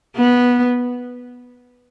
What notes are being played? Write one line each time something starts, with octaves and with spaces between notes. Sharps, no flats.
B3